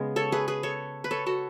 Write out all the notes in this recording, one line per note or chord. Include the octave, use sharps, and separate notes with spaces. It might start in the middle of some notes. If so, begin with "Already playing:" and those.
Already playing: C#3 G#3 B3
A4 C#5
G#4 B4
G#4 B4
A4 C#5
B4
A4 C#5
F#4 A4